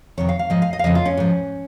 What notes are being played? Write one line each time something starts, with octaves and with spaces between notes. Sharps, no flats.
F2 C3 D#3 C#5
F5
F5
G#2 F3 D#5
F5
D#5
F5
F2 C#3 F3 D#5
F4
C#4
G#2 F3